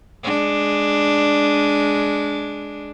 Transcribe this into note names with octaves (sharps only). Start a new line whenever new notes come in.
G#3 D4